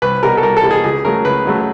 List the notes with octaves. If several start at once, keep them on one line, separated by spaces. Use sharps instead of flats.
C2 B4
B2 G3 A#4
A4
C2 A#4
A4
B2 G3
G#4
C#2 G#4
C#3 F#3 A3 A#4
C#2 B4
C#3 F#3 A3